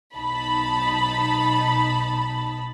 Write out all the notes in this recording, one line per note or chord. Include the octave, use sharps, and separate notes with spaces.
B1 D#4 A5 B5